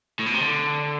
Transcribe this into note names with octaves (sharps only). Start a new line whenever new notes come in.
A2
B2
C3
D3